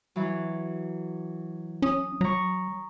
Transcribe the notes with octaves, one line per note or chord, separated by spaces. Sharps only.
E3 F#3
C#4 D#6
F#3 A#5 C#6